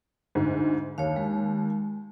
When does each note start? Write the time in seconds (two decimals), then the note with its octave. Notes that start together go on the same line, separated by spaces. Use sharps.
0.35 D2 G#2 D3
0.98 D#2 C#5 F5
1.16 G#3